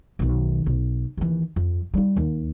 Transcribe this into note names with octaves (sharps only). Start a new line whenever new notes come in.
B1 D#3
B1
D#2 E3
F2
G3 D#4
D#2